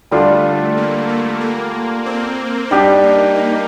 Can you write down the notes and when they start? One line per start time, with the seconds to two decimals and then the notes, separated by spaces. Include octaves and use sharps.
0.11 D3 G3 A3 D4 F4
0.77 A#3
1.09 A3
1.41 A#3
2.06 C4
2.71 G3 D4 D#4 G4
3.03 A#3
3.36 A#3